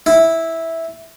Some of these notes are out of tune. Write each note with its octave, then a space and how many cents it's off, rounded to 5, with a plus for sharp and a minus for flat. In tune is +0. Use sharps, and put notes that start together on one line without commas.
E4 -5